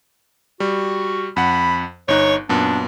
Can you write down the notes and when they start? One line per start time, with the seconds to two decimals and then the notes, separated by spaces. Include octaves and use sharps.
0.60 G3 F#4
1.37 F2 F#5 B5
2.08 G1 D#4 C#5 F#6
2.49 F#2 A#2 B3 D4